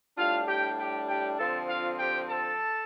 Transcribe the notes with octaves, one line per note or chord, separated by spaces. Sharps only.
A2 G3 D4 F4 F5
G4 G5
G4 G5
G4 G5
D3 F3 C4 A4 A5
F4 F5
G4 G5
A4 A5